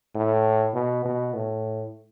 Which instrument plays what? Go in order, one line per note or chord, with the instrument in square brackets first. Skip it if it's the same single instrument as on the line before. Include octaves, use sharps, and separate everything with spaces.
[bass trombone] A2
B2
B2
A2